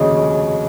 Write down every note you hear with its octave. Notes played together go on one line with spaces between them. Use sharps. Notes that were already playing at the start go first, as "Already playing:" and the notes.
Already playing: F1 D#2 C#3 F#4 G#4 C#5 D#5